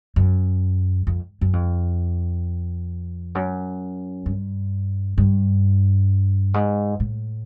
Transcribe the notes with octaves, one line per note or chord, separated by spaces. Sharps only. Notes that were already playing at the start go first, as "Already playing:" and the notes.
F#2
F2
F#2
F2
F#2
G2
G2
G#2
A2